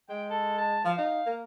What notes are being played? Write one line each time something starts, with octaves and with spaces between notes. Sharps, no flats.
G#3 G5
A4
A5
F3 F5
D#4
A#3